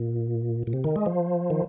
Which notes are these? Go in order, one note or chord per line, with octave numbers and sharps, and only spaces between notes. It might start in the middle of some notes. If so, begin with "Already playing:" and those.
Already playing: A#2
A#2
C3
D#3
G#3
F3
D#3